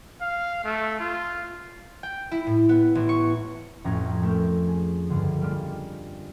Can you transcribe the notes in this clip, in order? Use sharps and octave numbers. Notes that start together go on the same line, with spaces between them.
F5
A3
F4
G5
E4
A2
B3
A1
C#6
A1 F2 C#4 A#5 F#6 G#6
A3 A#4 G6
G#4
C#2 G2 D3
G3 A#3 F4 D5